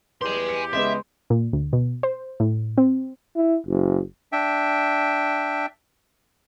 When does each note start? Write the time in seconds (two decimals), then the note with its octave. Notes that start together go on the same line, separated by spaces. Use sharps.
0.22 E2 G4 B4 G#5 C6
0.49 C#7
0.73 C#3 G#3 B3 E5 C6
1.30 A#2
1.53 D2
1.73 B2
2.03 C5
2.40 A2
2.78 C4
3.36 E4
3.67 F#1
4.32 D4 E5 G5